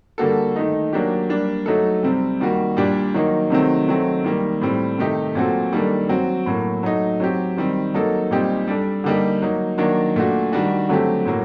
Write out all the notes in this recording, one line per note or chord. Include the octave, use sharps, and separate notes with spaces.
D3 G3 A#3 F#4 A4
D#3 A3 D#4
F#3 A#3 D4 G4
G3 A#3 D4
F#3 A3 D#4 A4
C3 G3 C4
D#3 G3 A#3 F#4
A#2 G3 D4 G4
D#3 F#3 A#3 D#4
C3 D#3 F#3 A3 C4
D#3 F#3 A3 C4
D#3 G3 A#3
A2 G3 C4
C3 D#3 A3 D#4 G4
A#2 F#3 C4 F#4 A4
D#3 G3 A#3 D4 A4
F#3 C4 F#4
A2 F#3 A#3
F#3 A3 D#4
F#3 C4 G4
D#3 G3 C4
F#3 A#3 D#4 A4
A#2 G3 C4 D#4 G4
G3 D4 A4
D3 G3 A#3 D#4 G4
F#3 A#3 D#4
D#3 F#3 A#3 D4
A#2 A3 D4 F#4
D#3 G3 D4 F#4
D3 F#3 A3 C4 G4
A2 F#3 A#3